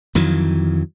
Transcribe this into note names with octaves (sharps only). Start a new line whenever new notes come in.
F2 D#3 E3 F#3